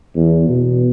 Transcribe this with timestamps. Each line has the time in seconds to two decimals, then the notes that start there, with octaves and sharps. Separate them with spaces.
0.16 E2
0.48 B2